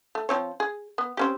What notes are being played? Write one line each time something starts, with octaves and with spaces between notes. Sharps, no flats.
A3
F3 C4 C#5
G#4
B3
C4 C#4 G4